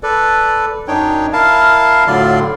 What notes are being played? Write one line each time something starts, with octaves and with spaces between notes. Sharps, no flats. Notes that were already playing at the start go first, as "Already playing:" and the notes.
A4 B4 D5
F#2 D4 D#4 C#5 G5
E4 A#4 F5 A5
A2 D3 F#3 F4 D5 C6